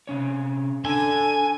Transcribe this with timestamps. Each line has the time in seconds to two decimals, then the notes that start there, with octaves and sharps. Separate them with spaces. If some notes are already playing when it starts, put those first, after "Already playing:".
0.07 C3 C#4 C#5
0.85 D4 A4 D5 G#5 A5